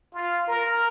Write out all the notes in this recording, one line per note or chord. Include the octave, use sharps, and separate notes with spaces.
F4
A#4